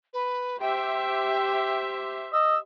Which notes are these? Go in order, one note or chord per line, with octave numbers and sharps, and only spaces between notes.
B4
G4 C5 E5 G5
D#5 E6